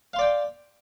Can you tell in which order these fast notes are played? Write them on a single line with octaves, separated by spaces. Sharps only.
F5 C6 D5 G5